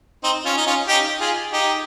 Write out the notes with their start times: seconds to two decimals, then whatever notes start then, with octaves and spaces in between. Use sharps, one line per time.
0.24 C4 D#4
0.45 C#4 F4
0.57 D#4
0.67 C#4 F4
0.88 D#4 G4
1.20 F4 G#4
1.52 D#4 G4